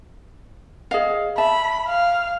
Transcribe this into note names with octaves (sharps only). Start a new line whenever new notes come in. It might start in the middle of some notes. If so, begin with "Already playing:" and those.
G#4 D#5 F5
E5 A5 B5
F5